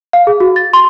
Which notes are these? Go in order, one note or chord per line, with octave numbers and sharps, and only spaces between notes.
F5
G#4
F#4
A6
C6